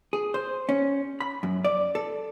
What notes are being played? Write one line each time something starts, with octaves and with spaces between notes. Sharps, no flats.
G#4
C5
C#4
B5
F#2
D5
A4